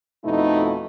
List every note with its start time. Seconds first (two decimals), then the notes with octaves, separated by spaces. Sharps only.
0.24 F2 B2 A3 D#4 E4